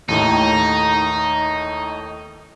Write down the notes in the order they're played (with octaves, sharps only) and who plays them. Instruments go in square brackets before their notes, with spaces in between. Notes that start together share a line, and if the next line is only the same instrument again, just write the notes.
[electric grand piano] D#2 A2 D#3 [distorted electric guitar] D#4